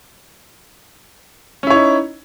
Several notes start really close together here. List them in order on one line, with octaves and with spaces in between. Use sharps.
C#4 E4 C#5 D#4